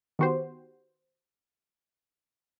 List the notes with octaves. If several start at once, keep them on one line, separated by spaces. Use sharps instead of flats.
D#3 B3 F#4 G4 C5